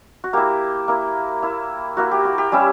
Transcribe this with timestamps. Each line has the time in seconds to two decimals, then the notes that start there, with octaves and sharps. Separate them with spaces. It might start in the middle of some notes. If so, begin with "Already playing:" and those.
0.24 F#4
0.33 A#3 E4 G4
0.88 A#3 E4
1.42 A#3 E4
1.97 A#3 E4 F#4
2.11 G4
2.25 F#4
2.38 G4
2.52 G3 C#4 E4